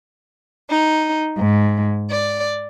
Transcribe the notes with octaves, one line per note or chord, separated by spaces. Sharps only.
D#4
G#2
D5